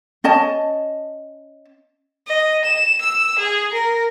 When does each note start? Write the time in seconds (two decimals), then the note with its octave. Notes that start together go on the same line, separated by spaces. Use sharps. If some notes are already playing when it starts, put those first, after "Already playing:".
0.24 C#4 D#5 A5
2.27 D#5
2.65 E7
3.02 E6
3.39 G#4
3.73 A#4